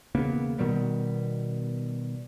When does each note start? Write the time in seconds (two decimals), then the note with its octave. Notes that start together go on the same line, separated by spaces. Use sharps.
0.15 E1 C#3 A#3 B3
0.58 B2 D#3 G3 B3